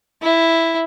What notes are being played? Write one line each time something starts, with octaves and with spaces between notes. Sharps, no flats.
E4